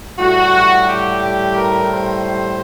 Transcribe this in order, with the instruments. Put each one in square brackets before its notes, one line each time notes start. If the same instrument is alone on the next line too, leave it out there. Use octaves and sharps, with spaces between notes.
[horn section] A2 G3 F#4
G4
A#4
C5